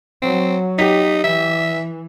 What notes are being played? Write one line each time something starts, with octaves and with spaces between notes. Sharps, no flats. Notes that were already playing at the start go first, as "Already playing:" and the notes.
F#3 C4
D#4 G4 B6
E3 E5